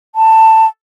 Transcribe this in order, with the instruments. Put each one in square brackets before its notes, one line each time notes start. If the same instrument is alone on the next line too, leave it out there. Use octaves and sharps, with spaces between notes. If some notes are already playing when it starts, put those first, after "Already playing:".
[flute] A5